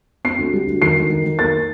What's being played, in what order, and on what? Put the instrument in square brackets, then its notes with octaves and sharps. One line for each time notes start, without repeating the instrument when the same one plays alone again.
[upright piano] C4 C7
D2
G3
D2
D#3 C7
D#3
D#3
D#3
A#3 A6